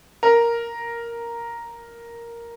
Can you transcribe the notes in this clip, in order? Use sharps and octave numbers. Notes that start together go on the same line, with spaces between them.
A#4